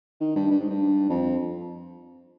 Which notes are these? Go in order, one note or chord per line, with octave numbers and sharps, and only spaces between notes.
D#3
G2
G2
G#2
G2
F2